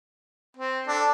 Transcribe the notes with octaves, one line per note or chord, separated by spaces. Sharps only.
C4
D4 A4